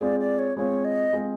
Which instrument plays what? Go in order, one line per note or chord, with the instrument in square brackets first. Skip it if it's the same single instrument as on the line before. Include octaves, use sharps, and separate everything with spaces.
[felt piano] G#3 C4 F4 G#4 [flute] D5
[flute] D5
C#5
[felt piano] G#3 C4 F4 G#4 [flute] C#5
[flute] D#5
[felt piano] G#3 C4 F4 G#4